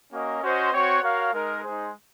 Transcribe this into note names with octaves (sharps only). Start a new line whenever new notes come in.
A#3 C#4 F#4 A#4 D#5
C#4 F#4 C5 D#5
C4 F#4 C#5 F#5
F#4 A#4 C#5 F5
G#3 D#4 A#4
G#3 D#4 G#4 C5